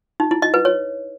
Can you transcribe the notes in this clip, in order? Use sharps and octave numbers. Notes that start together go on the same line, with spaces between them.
D#4
E4
D#5
B4
C#5